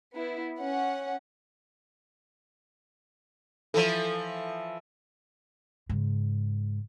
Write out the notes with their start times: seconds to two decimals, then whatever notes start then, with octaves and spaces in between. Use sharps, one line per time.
0.15 B3 E4
0.59 C#4 F#5
3.74 E3 F3 A4
5.89 G#2 C#3